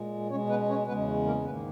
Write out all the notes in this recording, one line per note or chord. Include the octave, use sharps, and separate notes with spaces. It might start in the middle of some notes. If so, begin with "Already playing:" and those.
Already playing: A#2 G#3
B2 G#3 C#4 C#5
B3 B4
C#4 C#5
E2 C#3 G#3 B3 B4
A#3 A#4
G#2 D#3 A#3 B3 B4